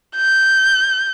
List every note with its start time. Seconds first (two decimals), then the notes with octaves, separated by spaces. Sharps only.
0.16 G6